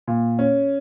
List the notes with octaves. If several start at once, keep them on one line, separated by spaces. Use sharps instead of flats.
A#2
C#4